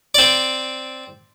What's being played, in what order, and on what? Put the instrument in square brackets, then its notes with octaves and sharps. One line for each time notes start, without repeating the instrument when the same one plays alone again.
[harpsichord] C4 D5